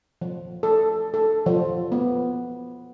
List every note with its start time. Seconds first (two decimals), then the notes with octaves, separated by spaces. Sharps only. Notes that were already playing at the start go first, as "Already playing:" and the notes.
0.22 F3
0.63 A4
1.14 A4
1.46 F3
1.92 B3